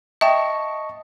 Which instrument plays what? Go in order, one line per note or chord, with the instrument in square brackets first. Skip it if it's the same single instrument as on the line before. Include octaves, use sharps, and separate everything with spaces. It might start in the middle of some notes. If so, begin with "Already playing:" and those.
[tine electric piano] D#5 A5 C#6 [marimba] E5 G5